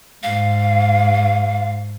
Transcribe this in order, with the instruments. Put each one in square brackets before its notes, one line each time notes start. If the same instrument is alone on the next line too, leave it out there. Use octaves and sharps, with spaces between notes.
[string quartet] G#2 [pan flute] F5